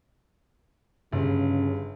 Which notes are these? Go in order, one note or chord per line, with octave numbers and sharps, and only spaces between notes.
G1 C#3